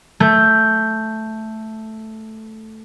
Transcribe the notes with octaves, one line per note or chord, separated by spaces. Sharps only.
A3 G6